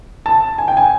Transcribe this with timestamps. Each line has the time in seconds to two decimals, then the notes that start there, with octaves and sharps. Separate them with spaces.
0.26 A5
0.58 G#5
0.68 G5
0.77 G#5